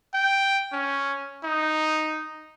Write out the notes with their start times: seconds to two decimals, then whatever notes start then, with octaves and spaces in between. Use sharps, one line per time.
0.14 G5
0.73 C#4
1.44 D#4